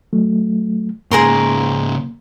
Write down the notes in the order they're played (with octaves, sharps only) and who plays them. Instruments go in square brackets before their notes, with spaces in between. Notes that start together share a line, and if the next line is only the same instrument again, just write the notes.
[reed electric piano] F#3 A3
[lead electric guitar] G#2 C#3 [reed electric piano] A#3 [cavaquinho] G#4 A#4 C6